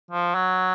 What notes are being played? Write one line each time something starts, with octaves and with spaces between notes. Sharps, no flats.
F3
F#3